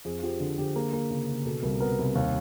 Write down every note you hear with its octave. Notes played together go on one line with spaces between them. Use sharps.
F2 G#4
F3 G4
D3
D3 G4
A#3 G#4
A#3
C#3
C#3
B2 A4
C2 A#4
B3 A#4
C2
D#2